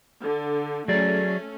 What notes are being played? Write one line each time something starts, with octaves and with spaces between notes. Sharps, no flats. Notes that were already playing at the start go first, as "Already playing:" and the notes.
D3
F#3 A3 C#4 G#4 D5